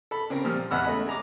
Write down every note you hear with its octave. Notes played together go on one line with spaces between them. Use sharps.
A4 B5
C#3 C4 A#4
A#2 F3 G3 F6
E2 G#3 F#5 B5 E6 F6
A3 C#4 D#5 B5
G#3 A#5 D6